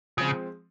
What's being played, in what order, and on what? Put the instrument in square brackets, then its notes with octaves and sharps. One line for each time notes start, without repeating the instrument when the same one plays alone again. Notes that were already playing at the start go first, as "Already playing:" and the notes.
[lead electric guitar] C#3 [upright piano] F3 G#3 C4